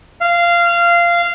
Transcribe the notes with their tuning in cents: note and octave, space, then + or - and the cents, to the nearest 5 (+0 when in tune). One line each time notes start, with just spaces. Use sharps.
F5 -15